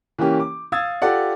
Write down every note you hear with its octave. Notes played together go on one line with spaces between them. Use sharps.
E3 A#3 C#4 G4
D6
F5 D#6 E6 G#6 A6
F4 G4 A4 D5 F#5